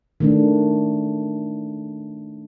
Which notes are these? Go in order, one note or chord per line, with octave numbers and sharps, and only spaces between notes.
D#3 A3 D4